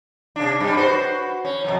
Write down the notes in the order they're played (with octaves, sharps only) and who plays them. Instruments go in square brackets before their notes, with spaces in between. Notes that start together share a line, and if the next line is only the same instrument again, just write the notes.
[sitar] C3 D4
G2 G3
F#4 B4 C5
C#4
F2 B2 F#3